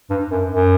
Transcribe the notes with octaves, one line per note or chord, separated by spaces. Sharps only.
G2
F#2
F#2